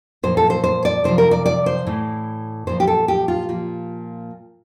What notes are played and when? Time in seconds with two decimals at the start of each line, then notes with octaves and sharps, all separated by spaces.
0.23 A#2 F3 C5
0.37 A4
0.50 C5
0.64 C5
0.85 D5
1.04 C3 F3 C5
1.18 A#4
1.31 D5
1.46 D5
1.66 C5
1.86 A2 E3
2.67 A#2 F3 C5
2.80 G4
2.87 A4
3.08 G4
3.28 F4
3.49 A#2 F3